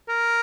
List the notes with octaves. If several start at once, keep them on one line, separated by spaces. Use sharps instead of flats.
A#4